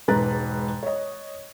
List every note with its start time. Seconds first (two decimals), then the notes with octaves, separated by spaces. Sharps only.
0.08 E1 G#2 B4 A#5 F#6 A6
0.83 C#5 D#5